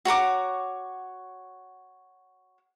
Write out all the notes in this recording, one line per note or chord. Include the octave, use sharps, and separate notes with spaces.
F#4 C#5 A#5 D6